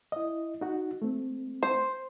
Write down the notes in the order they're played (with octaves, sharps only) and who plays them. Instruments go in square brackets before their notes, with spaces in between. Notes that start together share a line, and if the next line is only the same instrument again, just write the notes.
[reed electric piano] E4 D#5
D#4 F#4
A3 C4
[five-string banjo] C5